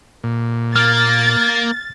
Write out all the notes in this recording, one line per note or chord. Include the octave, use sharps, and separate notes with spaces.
A#2
A#3 F6 A6